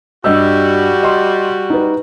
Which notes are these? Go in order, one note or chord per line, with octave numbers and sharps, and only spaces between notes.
G2 G3 F#4 D#5 E6
D#5 C6
D#4 B4